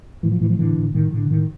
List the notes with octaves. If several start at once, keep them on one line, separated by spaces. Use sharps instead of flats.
A2 E3
F3
A2 E3
F3
A2 D3 E3
A2
A2 D#3
A2 D3
A2 D#3